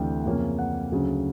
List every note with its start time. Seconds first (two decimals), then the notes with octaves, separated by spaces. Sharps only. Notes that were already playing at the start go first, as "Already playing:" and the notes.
Already playing: D2 C3 E3 A3 D4 G5
0.25 F2 C#3 F3 A#3 C#4
0.58 F#5
0.92 D2 C#3 F#3